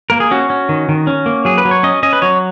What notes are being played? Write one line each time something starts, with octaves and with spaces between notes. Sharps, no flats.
A#3 A#4
G#4
C#4 F#4
C#4
D#3
D#3
C#4
A#3
F#3 G#4
B4
F#3
C#5
C#4 D#5
C#4 D#5
B4
F#3 C#5